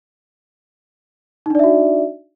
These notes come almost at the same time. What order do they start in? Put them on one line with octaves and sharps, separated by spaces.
D#4 D4 D5 E5 F#4